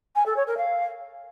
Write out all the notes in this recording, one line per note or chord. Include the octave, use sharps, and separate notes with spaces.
G#5
A4
C#5
A#4
F5